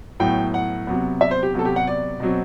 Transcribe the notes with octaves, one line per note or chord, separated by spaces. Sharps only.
A2 F#3 B3 G5
F#5
C3 F#3 B3
E5
C5
G4
C3 F#3 B3 A4
G4
F#5
D5
B2 F#3 C4